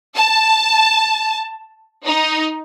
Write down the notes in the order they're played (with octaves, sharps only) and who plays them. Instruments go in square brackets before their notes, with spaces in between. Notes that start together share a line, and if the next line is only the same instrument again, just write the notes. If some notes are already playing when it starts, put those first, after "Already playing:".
[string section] A5
D#4